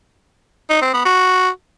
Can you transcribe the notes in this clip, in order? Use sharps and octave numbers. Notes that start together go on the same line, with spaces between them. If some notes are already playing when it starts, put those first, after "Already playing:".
D#4
C4
B3
F#4